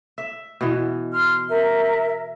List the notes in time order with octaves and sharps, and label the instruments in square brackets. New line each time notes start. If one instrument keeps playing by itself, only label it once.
[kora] E5
B2 E3
[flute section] C6 F6
A#4 E5